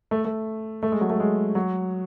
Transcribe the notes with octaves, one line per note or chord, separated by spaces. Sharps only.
A3
A3
A3
G#3
F#3
A3
G#3
F#3